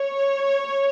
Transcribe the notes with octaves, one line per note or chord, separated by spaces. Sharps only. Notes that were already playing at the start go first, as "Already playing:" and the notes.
Already playing: C#5